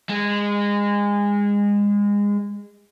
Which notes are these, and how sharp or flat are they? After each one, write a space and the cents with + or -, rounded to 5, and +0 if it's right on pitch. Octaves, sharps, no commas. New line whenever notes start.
G#3 -25